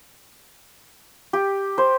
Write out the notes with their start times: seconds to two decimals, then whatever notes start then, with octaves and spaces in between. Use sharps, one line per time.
1.33 G4
1.78 C5